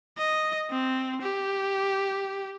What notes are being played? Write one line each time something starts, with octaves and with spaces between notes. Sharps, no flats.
D#5
C4
G4